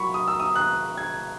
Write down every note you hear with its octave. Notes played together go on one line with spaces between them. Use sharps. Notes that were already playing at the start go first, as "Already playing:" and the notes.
Already playing: A#2 F#3 A#3 B5 C#6
D#6
E6
D#6
F#6
G#6